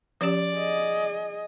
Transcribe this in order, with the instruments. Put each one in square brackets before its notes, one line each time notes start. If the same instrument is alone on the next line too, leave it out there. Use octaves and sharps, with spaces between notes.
[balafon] F3 C#4 G4 [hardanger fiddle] D5
[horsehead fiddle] G#4 D#5